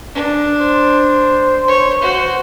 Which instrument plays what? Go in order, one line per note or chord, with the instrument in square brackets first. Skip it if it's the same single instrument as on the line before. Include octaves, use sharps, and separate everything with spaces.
[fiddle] D4
[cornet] C5
[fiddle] C#5
F#4 C5